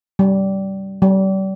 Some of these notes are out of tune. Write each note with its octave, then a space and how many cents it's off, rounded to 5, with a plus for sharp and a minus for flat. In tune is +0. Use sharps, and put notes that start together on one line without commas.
G3 -20
G3 -35